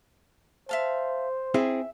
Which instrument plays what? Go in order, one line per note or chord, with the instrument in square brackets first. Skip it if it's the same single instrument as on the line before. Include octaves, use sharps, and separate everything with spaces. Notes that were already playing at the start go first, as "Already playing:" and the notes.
[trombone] C5 [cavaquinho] E5 F5 A5
[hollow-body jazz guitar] C4 E4 G#4 [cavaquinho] E5